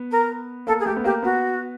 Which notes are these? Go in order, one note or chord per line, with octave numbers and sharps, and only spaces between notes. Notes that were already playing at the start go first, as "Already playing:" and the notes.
Already playing: B3
A#4
A#3 A4
G#4
A3 G4
B3
A#3 G4
B3 F#4